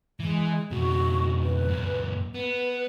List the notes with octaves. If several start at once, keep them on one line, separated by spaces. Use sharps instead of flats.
E3 G#3
F2 B2 F#4
B4
F#2 A#2
B3 B4